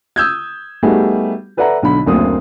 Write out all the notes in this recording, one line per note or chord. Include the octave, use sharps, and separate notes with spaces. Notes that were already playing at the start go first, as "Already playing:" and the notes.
D#6 E6 G6 G#6
G3 A3 B3 D#4 F#4 G#4
A4 B4 D5 E5 F#5 A#5
B1 D3 B5
F#1 D2 A#3 C4 D#6